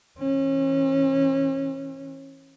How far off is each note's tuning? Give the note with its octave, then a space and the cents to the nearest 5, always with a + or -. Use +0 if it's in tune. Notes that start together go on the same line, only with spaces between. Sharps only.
E3 -15 C#4 -35